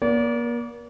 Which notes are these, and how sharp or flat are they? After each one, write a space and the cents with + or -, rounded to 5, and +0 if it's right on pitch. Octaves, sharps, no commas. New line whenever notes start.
A#3 +40 D5 -35